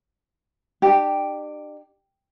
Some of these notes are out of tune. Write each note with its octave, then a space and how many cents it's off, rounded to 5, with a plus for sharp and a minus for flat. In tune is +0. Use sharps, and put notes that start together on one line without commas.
D4 +40 G4 +0